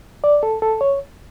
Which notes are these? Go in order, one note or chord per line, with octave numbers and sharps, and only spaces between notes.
D5
A4
A4
C#5